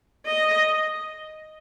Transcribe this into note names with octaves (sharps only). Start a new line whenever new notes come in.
D#5